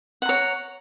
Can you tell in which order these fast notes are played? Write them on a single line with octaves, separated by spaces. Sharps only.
F#5 A#5 C#5